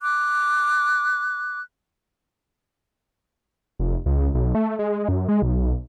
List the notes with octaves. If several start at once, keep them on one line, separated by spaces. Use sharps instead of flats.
D6 F#6
F1
C#2
B1
A3
G#3
F#2
G#3
B1